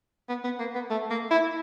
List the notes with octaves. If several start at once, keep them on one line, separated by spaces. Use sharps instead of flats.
B3
B3
A#3
B3
A3
A#3
E4